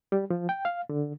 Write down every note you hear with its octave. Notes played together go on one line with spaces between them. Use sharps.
G3
F3
G5
F5
D3